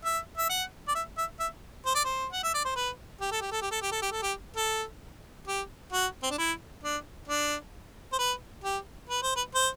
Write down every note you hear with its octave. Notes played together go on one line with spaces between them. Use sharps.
E5
E5
F#5
D5
E5
E5
E5
C5
D5
C5
F#5
E5
D5
C5
B4
G4
A4
G4
A4
G4
A4
G4
A4
G4
A4
G4
A4
G4
F#4
C4
D4
E4
D4
D4
C5
B4
G4
B4
C5
B4
C5